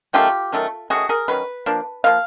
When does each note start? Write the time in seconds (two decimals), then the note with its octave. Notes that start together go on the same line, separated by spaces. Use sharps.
0.13 D#3 F#3 A3 C#4 F4 G4
0.52 D#3 F#3 A3 C#4
0.90 D#3 F#3 A3 C#4 F#4 G#4
1.09 G#4 A#4
1.28 D#3 F#3 C#4 B4
1.66 F3 A#3 D4
2.04 F3 A#3 F5